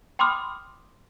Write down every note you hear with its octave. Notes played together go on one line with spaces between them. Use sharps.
G5 B5 C6 D6 D#6 F6